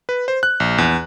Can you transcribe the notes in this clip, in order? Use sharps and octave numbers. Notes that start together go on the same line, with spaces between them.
B4
C5
F#6
A#1
E2